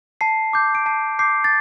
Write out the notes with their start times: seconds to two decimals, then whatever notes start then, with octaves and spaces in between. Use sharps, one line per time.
0.21 A5 C7
0.53 D6 G6
0.75 D7
0.86 A5 C7
1.19 D6 G6 C7
1.44 A6